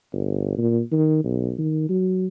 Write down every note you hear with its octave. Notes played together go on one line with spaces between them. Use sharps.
G1
A#2
D#3
B1
D#3
F#3